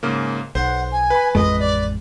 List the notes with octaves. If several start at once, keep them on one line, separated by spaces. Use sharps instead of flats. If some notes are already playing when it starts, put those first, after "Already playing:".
G#2 C#3 A#3
B1 C5 F#5
G#5
B4 B5
A1 F2 G#3 D#5
D5